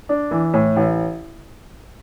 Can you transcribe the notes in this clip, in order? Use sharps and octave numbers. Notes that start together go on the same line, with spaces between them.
D4
E3
A2
A1